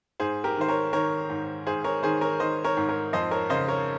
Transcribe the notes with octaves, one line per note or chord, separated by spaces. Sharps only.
G#2 G#4 C5
G4 A#4
D#3 C5
A#4 C#5
D#3 A#4 C#5
G#2
G#2 G#4 C5
A#4 C#5
D#3 G#4 C5
A#4 C#5
D#3 C5 D#5
A#4 C#5
G#2
A#4 C#5
F2 C5 D#5
A#4 C#5
C#3 C5 D#5
A#4 C#5